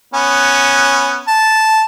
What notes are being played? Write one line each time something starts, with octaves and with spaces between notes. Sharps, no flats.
B3 C#4
A5